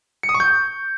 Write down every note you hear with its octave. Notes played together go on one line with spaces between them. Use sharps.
C#7
D#6
C#6
G6